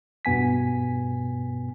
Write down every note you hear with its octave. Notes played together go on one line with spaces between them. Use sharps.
G2 B2 B3 G#5 B6